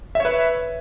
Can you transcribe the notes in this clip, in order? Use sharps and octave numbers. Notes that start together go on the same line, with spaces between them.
B4 C#5 E5